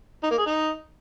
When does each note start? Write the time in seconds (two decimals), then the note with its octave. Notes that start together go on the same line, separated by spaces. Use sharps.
0.23 D#4
0.31 A#3
0.38 G#4
0.46 D#4